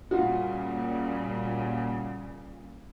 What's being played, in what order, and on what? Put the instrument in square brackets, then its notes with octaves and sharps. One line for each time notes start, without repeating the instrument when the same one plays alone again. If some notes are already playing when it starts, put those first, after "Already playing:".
[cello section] A#2 C#3 G3 [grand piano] F4 F#4